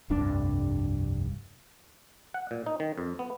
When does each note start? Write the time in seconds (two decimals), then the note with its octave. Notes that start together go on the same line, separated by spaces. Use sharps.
0.10 F1 C2 G2 D4
2.34 F#5
2.51 A#2
2.66 D#4
2.80 D#3
2.98 F2
3.19 B3